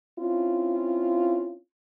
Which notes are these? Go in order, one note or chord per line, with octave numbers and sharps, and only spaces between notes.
C4 C#4 E4 F4